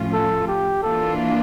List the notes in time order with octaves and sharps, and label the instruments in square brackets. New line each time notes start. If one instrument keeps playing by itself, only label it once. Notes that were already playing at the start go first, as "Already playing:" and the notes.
Already playing: [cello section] A2 F3 C#4 F4
[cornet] A4
G4
[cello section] E3 A#3 D4 F4 [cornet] A4